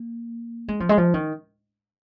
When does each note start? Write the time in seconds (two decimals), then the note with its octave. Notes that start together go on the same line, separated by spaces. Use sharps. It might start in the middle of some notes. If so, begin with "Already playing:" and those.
Already playing: A#3
0.68 G#3
0.80 F3
0.89 G#3
0.98 F3
1.14 D#3